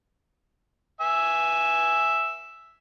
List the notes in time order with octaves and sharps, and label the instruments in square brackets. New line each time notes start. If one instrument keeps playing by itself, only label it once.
[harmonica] E5 G#5